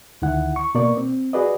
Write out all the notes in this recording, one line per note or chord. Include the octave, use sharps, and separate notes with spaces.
D2 D#3 E4 F#5
C#6
B2 A#3 D5 C#6
C4
F#4 G#4 B4 D5 D#5